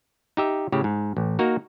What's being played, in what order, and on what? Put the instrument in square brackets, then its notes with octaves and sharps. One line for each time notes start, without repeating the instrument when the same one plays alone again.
[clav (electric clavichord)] D#4 G4 E5
A2 C#3 G4
G#2
A1
A#3 D#4 F#4 A#4